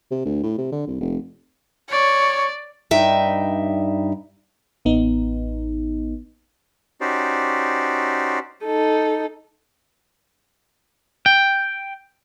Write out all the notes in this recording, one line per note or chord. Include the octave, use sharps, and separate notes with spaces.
C3
D2
A2
C3
D3
C2
F1
C#5 D5
G2 D#4 E5 G5
A1 B3 D#4
C#4 D#4 F#4 G4 C5 D5
D#4 A4
G5